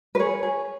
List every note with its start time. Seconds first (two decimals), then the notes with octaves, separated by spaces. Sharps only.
0.15 B4
0.19 G#4 C#5
0.43 G#4